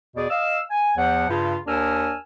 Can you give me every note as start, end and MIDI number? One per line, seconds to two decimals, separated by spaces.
0.16 0.26 40
0.16 0.26 47
0.16 0.26 68
0.16 0.26 74
0.30 0.59 75
0.30 0.59 77
0.30 0.59 88
0.70 0.92 80
0.97 1.28 40
0.97 1.28 53
0.97 1.28 78
1.29 1.56 43
1.29 1.56 49
1.29 1.56 65
1.67 2.15 39
1.67 2.15 62
1.67 2.15 70
1.67 2.15 80
1.67 2.15 88
1.67 2.15 89